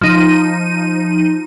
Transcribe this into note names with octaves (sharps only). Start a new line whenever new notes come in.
F3 D#4 D#7